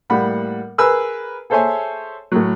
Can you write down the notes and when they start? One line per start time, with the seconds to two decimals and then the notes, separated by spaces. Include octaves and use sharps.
0.10 A2 G3 A#3 F#5 B5
0.78 G#4 A#4 B4 G#5 E6 F#6
1.50 G#4 A4 C5 C#5 E5 G#5
2.32 A2 F#3